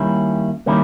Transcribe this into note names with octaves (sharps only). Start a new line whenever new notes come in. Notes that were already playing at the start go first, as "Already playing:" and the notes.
Already playing: D#3 G3 A#3 C#4 E4
D#3 G3 A#3 C#4 E4